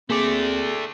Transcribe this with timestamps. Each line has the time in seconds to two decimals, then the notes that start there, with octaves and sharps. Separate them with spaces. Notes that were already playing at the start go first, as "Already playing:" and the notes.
0.10 A3 A#3 C4 G#4 D5 D6